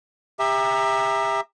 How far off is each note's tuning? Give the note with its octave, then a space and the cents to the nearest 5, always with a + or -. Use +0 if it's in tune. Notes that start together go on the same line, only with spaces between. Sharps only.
G4 +30 E5 +0 A#5 +0